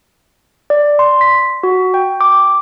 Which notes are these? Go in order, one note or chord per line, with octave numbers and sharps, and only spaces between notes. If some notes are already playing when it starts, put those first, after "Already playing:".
D5
C6
B6
F#4
G5
D6